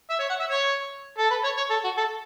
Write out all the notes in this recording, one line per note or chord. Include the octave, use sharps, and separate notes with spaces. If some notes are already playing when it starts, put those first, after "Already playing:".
E5
C#5
F#5
E5
C#5
A4
B4
C#5
C#5
A4
F#4
A4